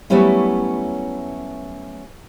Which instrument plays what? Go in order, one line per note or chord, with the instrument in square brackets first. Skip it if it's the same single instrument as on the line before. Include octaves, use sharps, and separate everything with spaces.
[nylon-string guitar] F#3 G3 A3 B3 C#4 E4